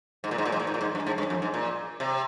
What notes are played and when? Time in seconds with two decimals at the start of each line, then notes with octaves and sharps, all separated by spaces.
0.24 G#2
0.31 A#2
0.38 G#2
0.45 A#2
0.52 G#2
0.60 A#2
0.67 G#2
0.74 A#2
0.81 G#2
0.95 G2
1.07 G#2
1.18 G2
1.30 F2
1.42 G#2
1.54 A#2
2.00 C3